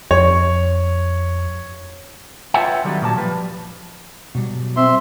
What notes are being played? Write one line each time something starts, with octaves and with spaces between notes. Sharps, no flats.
F2 C#5
F4 B4 C#5 E5 F#5 G5
D3 D#3 F#3 G3 B3
A#2 F#3 D5 A5
F3 G3 B4
B2 F#3 G3
C4 E5 C6